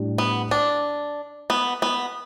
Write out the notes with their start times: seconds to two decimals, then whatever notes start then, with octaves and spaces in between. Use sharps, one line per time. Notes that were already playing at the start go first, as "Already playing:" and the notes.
Already playing: A2 G3 D4 G4
0.18 B3
0.51 D4
1.50 B3
1.82 B3